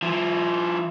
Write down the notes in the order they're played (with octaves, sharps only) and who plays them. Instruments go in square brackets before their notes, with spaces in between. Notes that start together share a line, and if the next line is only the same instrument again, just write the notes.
[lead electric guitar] F3 E4